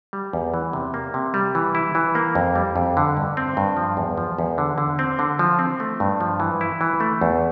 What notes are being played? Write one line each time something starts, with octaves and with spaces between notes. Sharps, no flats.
G3
E2
E3
C3
A#3
C3
G3
E3
E4
E3
A#3
F2
G3
F2
D3
G2
C4
G2
F3
E2
F3
E2
D3
D3
C4
D3
F3
C4
A3
G2
F3
E3
E4
E3
A3
E2